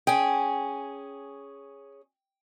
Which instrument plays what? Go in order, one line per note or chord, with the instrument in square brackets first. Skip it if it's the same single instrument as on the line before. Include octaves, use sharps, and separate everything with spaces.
[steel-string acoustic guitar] C#4 G#4 [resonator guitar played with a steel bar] G5